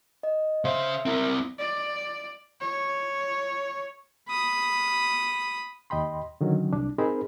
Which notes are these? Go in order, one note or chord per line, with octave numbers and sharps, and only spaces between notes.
D#5
C#3 C5 E5 F5
C4 E4 A#4
D5
C#5
B5 D#6
D#2 D#5 G5 B5 C6
D3 D#3 F#3 C#4
C2 D4
C4 D#4 G#4 A#4 C5 B5